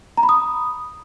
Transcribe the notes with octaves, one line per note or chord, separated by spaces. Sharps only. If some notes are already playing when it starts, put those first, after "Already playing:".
A#5
B5
D#6